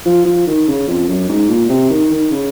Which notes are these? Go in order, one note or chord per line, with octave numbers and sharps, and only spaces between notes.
F3
F3
D#3
C#3
F2
F#2
G#2
A#2
C3
D#3
D#3
C#3